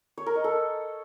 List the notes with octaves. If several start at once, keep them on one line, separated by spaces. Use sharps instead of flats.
C#5
A#4
D#5
A4